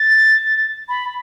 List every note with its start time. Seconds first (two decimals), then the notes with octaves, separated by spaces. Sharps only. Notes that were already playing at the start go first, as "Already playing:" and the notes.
Already playing: A6
0.89 B5